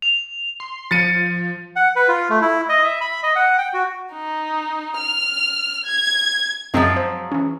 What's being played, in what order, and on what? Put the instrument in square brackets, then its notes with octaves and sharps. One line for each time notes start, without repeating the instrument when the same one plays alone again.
[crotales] F7
[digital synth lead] C6
[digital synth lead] F3 [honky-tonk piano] A6 C#7 D#7
[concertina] F#5
B4
F4
A3
E4
D#5
E5
B5
D#5
F#5
G5
F#4
[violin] D#4
F6
G#6
[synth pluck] F#2 C4 E5 [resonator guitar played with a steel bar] F3 F#3 G#3
[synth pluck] C5
E3 C#4